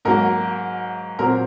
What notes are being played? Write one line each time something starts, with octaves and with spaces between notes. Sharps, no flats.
G#2 F#3 A#3 A#4
A#2 F#3 C4 A#4